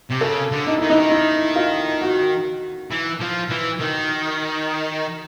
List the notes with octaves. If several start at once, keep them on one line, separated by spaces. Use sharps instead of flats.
C3
C#3 A4
D3
D#4
D#3 E4
E3 D#4
D#3
E4
F4
F#4
E3
F3
E3
D#3